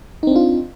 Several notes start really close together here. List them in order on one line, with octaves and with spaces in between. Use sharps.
D#4 C4 D4 F4